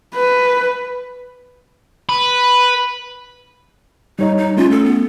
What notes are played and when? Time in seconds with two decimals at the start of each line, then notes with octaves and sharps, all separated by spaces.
0.15 B4
2.09 B4
4.19 G3 D#4 C#5 D#5
4.38 D#4
4.57 A3 C#4 F4
4.72 A4
4.85 B3